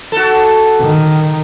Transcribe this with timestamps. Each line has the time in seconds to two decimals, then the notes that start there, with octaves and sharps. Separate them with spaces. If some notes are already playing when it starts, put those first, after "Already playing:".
0.12 F#4 A4
0.82 D#3